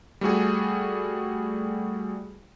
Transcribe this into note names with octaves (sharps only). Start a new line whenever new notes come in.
G3 A3 F#4 G#4